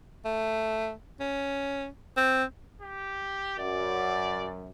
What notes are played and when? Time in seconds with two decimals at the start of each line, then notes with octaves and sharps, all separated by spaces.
0.25 A3
1.20 C#4
2.17 C4
2.81 G4
3.59 F#2 D5